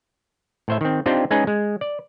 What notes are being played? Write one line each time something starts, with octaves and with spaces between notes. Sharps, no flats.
A2 C5 E5
D#3 C4
C4 D4 D#4 F4 G4 C5
G#3 C#4 D#4 G#4 B4
G#3
D5